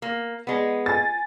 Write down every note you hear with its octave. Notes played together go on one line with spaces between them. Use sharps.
A#3
G#3 B3
G#5 A6